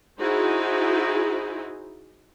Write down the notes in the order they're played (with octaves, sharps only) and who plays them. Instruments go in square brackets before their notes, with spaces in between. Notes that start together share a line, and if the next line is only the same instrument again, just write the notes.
[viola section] D#4 E4 F#4 G#4 C5